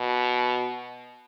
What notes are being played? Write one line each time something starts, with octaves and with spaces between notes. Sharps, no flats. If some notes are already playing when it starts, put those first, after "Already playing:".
Already playing: B2